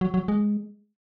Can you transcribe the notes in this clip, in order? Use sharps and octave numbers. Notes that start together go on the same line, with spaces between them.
F#3
F#3
G#3